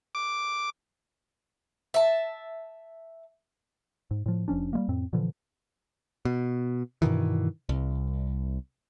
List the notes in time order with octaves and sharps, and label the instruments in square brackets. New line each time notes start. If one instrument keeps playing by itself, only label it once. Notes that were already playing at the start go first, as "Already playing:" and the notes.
[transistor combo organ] D6
[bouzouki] E5 A5
[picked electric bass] G#2
A2 F3
F1 F3 C#4 D4
G3 G#3 A#3
F2 A2 C4
A#2 D3 E3 F3
B2
G2 B2 D#3 E3
C2